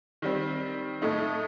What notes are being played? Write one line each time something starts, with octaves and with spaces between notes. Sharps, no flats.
D#3 G3 C4
A2 A3 D#4